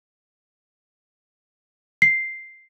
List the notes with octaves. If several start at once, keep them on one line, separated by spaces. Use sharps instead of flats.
C7